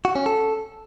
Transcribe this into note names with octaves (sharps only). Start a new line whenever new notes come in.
F#4
C#4
A4